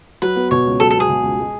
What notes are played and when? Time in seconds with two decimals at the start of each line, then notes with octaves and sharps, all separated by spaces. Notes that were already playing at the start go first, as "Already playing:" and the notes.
0.22 F#3 B4
0.36 B3
0.51 B2 C#5
0.66 C#2
0.80 F#3 A4
0.91 A4
0.95 B3 G#4
1.09 B2
1.23 C#2
1.38 G#3